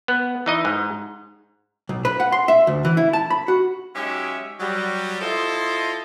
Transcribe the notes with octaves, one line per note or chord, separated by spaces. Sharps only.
B3
E3 D#4 D#5
G#2
B1
B4
F#5
C6
E5
D2
E3
E4
A5
B5
F#4
F#3 G#3 C#4 D#4 G4 E5
F#3 G3
F3 E4 F4 A4 D#5 C6